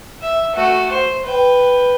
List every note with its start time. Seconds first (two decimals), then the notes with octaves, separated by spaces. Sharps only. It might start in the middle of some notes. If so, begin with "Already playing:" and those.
0.22 E5
0.54 A3 F#4
0.91 C5
1.24 B4 G5